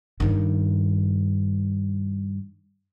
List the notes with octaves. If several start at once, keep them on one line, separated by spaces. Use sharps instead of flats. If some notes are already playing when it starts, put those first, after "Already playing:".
G2 D#3